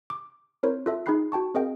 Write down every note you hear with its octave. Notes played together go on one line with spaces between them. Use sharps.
D6
C4 E4 A#4 C5 C#5
F4 A4 E5
D#4 G#4 G5 B5 F#6 C7
F#4 G5 A5 C#6
C4 G#4 A#4 D#5 F5 G5